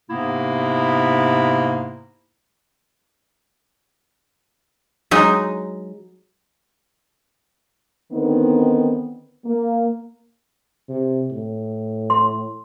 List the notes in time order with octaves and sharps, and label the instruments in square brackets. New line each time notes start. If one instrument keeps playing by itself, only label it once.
[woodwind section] G#2 C3 A#3 B3 E4
[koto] F#3 G#3 D#4
[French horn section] D3 D#3 B3 C4 D#4
A#3
[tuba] C3
A2
[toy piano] C6